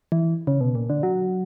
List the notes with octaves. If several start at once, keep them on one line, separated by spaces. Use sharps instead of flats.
E3
C#3
B2
A#2
D3
F#3